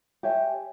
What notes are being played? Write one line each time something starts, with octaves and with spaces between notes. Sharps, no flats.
G4 C#5 E5 G#5